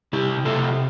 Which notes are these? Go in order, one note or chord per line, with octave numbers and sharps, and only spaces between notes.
C3 E4 G4
C3 F4 A4